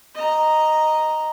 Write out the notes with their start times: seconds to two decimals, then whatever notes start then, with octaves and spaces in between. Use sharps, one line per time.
0.15 D#5 A#5